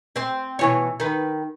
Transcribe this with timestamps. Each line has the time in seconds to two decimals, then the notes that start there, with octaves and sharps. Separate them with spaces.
0.16 C4 C5
0.59 B2 E3 C#5
1.00 D#3 B4